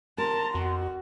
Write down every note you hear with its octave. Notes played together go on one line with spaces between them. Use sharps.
A#4 A5 A#5 C6
F2 F#4